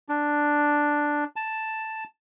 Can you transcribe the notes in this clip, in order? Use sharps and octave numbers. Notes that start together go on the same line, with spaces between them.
D4
A5